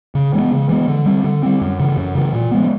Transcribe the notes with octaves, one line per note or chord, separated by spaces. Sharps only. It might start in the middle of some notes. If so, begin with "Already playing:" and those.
C#3
E3 G#3 B3
C#3
E3 G#3 B3
D3
G3 C4
D3
G3 C4
F#2
C#3 E3
F#2
C#3 E3
A#2
F3 G#3 B3